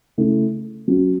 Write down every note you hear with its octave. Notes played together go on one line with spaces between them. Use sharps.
C#3 A3 E4
F#3 C#4 F#4